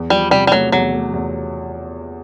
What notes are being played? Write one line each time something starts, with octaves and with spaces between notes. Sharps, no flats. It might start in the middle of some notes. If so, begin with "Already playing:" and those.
Already playing: E2
F3 G3
C3 G3
G3
F#3 A3
E2 F#3
A3
E2